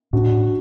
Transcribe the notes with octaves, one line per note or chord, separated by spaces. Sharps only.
A2 D4 F#4